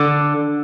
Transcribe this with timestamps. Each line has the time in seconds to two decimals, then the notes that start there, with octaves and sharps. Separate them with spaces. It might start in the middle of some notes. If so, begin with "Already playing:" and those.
Already playing: D3